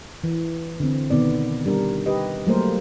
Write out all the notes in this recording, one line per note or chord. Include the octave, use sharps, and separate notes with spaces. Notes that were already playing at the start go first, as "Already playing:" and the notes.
E3
D3 C4
B2 D#3 B3 D5
G3 D4 A#4
G4 B4 D#5
F#3 G3 A3 A#3 A#4 C5